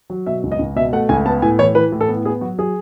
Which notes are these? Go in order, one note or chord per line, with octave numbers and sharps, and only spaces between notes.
F#3
B2 E5
C#2
D#5
C#2
B2 E5
A3 F#5
C#2 G#5
B3 A5
A2 G#5
E3 C#5
E3 B4
A2
A4
B3
B3 G#4
F#3 F#4
F#3 G#4